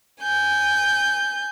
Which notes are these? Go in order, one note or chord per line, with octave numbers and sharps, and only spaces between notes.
G#5 G6